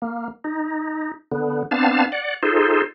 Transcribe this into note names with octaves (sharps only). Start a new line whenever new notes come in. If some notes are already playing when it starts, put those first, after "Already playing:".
A#3
D#4
D3 B3
B3 C4 D4 F5 A5
D5 F#5
D#4 F4 G#4 A4 C5